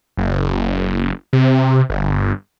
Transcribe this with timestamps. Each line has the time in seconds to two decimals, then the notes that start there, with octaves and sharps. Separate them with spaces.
0.17 F#1
1.33 C3
1.90 G1